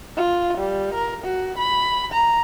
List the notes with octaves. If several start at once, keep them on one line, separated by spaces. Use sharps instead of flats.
F4
G3
A#4
F#4
B5
A#5